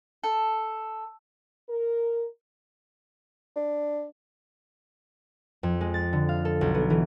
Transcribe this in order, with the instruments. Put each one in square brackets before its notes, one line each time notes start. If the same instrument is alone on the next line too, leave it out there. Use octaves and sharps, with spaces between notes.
[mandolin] A4
[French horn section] A#4
[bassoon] D4
[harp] F2
G#3
A6
D3
F5
A4
B1
B3
E3